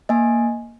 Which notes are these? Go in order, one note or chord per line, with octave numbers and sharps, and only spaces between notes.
A#3 D#5 G#5